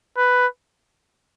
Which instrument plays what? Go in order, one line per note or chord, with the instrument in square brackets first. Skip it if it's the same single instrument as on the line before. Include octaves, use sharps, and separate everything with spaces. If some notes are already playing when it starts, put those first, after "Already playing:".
[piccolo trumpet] B4